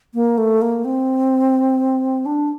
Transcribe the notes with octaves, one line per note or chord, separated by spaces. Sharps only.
A#3
A3
A#3
C4
D4